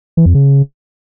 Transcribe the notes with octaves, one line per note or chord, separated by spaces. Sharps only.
E3
F2
C#3